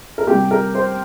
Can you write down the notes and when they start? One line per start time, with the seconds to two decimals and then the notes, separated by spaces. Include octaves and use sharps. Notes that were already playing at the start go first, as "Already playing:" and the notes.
0.18 A#4
0.27 C3 G3 G4
0.51 A#4
0.75 C5